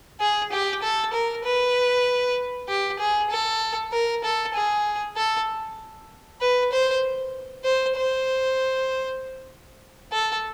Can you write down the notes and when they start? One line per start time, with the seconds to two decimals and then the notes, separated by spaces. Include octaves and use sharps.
0.20 G#4
0.52 G4
0.83 A4
1.13 A#4
1.45 B4
2.69 G4
2.99 G#4
3.31 A4
3.92 A#4
4.24 A4
4.55 G#4
5.17 A4
6.41 B4
6.72 C5
7.65 C5
7.96 C5
10.12 A4